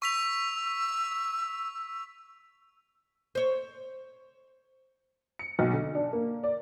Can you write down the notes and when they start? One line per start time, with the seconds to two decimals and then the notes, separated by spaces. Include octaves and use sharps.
0.02 C#6 E6 B6 F7
3.35 C5 C#5
5.39 C#7
5.59 B1
5.73 D3
5.95 D4
6.13 A#3
6.43 D5